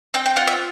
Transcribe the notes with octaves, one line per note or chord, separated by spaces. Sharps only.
C4 G5
G5
F4 F#5
E5